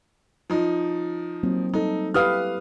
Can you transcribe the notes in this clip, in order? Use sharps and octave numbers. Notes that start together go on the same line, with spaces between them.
F3 D#4
F#3 A#3 C4
G3 D#4 A4
E4 G4 B4 F5 D#6 F6